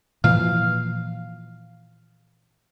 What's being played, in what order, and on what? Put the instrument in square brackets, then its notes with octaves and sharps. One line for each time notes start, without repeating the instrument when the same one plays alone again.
[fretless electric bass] A#2 E3 F3 [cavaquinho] F5